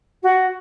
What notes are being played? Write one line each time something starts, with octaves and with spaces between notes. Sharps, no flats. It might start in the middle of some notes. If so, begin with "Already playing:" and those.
F#4